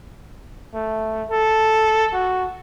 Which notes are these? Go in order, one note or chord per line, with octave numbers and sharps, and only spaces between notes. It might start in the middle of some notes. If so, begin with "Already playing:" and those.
A3
A4
F#4